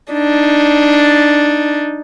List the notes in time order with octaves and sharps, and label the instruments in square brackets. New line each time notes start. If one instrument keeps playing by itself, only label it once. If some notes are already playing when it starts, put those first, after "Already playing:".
[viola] D4 D#4